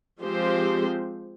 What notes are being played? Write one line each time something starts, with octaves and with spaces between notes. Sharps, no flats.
F3 G#3 C4 G4 C5